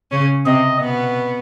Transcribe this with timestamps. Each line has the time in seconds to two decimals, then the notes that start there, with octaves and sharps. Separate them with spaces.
0.11 C#3 C#4
0.46 C3 C4 D#5
0.81 B2 B3